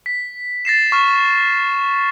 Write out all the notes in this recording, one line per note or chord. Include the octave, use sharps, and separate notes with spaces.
B6
A6 A#6 C7 E7
C#6 F6